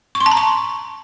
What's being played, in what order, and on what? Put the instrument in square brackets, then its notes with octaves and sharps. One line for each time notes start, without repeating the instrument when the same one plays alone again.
[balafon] C#6
C6
A5
A#5
C#6